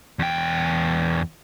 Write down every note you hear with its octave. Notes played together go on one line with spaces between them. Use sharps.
E2 G5